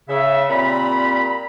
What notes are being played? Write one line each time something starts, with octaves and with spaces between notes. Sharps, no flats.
C#3 E5
A#2 G3 C4 A#5 B5